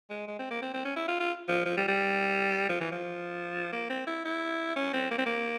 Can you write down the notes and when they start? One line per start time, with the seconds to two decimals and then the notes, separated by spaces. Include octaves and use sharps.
0.10 G#3
0.27 G#3
0.39 C4
0.51 A#3
0.62 C4
0.74 C4
0.85 C#4
0.96 E4
1.08 F4
1.20 F4
1.48 F3
1.65 F3
1.77 G3
1.88 G3
2.69 F3
2.81 E3
2.92 F3
3.73 A#3
3.90 C4
4.07 E4
4.25 E4
4.76 C#4
4.93 C4
5.11 A#3
5.18 C4
5.26 A#3